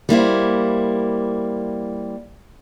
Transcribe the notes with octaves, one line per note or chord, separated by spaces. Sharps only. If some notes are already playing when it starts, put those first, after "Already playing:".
G3 A#3 E4 C5